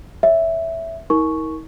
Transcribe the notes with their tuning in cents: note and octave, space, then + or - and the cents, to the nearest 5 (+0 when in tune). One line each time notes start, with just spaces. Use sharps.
C#5 +20 E5 +0
D#4 +45 A#4 +0 C#6 +0